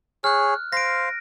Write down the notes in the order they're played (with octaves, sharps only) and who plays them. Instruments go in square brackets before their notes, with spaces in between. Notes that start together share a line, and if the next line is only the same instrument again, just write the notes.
[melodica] G#4 C#5 [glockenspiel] F6 F#6
[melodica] C5 F5 [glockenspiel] A#6 D7